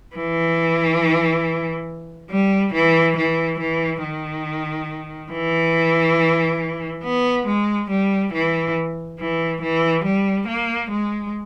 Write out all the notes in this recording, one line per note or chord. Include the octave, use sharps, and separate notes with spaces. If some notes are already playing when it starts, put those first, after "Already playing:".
E3
G3
E3
E3
E3
D#3
E3
B3
G#3
G3
E3
E3
E3
G3
A#3
G#3